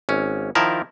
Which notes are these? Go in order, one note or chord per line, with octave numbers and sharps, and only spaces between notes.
G#1 C#4
D#3 F3 E4 A#4 A5